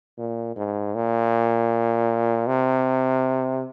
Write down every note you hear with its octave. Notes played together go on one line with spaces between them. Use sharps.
A#2
G#2
A#2
C3